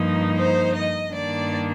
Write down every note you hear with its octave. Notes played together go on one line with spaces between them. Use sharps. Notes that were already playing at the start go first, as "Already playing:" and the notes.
Already playing: G2 F3 A#3 D#4
C5
D#5
G2 D#3 A#3 D4 D5